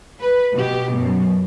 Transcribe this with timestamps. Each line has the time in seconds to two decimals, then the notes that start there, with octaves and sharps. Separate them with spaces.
0.21 B4
0.53 B2 G4
0.95 F#2 B2